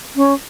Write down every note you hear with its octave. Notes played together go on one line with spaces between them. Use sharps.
C#4